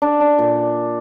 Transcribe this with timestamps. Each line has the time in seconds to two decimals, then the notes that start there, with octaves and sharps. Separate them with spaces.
0.02 D4
0.20 D4
0.39 A#2